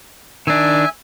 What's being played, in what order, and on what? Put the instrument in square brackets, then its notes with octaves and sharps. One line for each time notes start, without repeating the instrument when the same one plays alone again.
[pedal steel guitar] D#3 D4 [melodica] E5 G#5